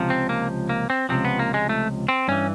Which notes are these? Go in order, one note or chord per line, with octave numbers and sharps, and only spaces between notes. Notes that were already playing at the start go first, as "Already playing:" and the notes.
Already playing: C#2 C3 F3
C4
A#3
A#3
C4
C#2 C3 F3 C4
B3
A#3
G#3
A3
C4
G2 E3 C#4